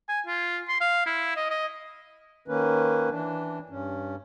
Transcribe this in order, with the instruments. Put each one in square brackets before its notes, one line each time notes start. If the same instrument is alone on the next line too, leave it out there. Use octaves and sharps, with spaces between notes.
[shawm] G#5
F4
C6
F5
E4
D#5
D#5
[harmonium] D#3 A#3 C#4 B4
E3 D4
G2 C#4